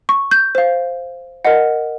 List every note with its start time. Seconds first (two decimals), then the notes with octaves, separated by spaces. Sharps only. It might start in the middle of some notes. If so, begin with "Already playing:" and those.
0.09 C#6
0.31 G6
0.55 C5 F5
1.45 A#4 D#5 F#5